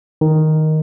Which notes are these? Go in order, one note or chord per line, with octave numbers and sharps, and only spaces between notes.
D#3